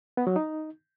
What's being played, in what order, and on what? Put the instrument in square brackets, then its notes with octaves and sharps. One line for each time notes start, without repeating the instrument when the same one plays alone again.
[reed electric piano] B3
F#3
D#4